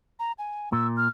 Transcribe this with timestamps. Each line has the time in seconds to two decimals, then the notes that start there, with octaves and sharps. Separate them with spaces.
0.19 A#5
0.39 G#5
0.73 A#2 E6
0.97 F6